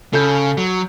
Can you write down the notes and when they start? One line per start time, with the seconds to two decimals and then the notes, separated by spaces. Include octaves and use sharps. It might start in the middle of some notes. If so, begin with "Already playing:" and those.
0.13 C#3 A4 B5 G6
0.57 F#3